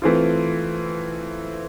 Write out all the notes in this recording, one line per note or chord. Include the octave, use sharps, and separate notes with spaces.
E3 A3 C4 F4